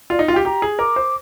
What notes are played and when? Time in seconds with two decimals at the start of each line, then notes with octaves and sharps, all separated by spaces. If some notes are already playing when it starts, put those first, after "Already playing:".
0.10 F4 D5
0.19 D#4
0.22 D#5
0.28 F4
0.33 G4 G5
0.45 G4 A#5
0.62 G#4
0.79 A#4 D6
0.96 C5